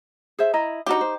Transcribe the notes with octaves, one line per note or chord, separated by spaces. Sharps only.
G#4 C5 E5
E4 D#5 A#5
D4 D#4 F#4 G4
C5